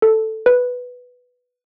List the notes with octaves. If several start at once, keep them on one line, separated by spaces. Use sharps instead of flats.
A4
B4